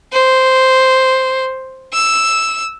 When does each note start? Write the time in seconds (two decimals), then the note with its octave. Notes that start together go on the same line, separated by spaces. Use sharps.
0.12 C5
1.93 E6